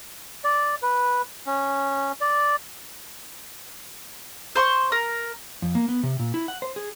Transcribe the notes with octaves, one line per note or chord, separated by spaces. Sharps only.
D5
B4
C#4
D5
C5 C6 C#6
A#4
F2
A#3
B3
C3
A#2
E4
F#5
C5
G#4